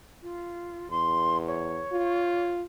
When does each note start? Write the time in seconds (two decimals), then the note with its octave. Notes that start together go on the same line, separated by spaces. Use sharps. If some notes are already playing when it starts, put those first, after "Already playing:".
0.23 F4
0.91 E2 C6
1.47 C#5
1.92 F4